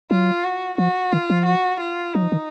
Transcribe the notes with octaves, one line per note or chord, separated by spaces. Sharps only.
F#3 F4
F#4
F3 F#4
D#3 F4
F3
F#4
F4
F#3 D#4
F3
D#3